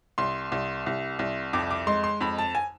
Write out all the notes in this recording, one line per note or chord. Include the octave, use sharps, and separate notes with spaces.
C2 C6
C2
C2
C2
F2 D6
D6
G#3 C6
C6
F2 B5
A5
G#5